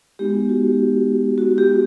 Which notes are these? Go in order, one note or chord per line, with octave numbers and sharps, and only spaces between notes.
G#3 B3 D#4 F#4 G4
F#4
F#4
G4